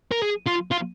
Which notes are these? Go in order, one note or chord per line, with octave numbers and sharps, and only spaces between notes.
A#4
G#4
F4
F4